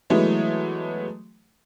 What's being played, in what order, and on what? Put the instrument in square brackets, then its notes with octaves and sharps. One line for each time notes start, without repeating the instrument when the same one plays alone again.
[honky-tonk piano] E3 F#3 G#3 A3 B3